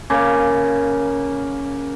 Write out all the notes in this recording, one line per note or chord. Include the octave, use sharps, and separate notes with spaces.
C#3 A#3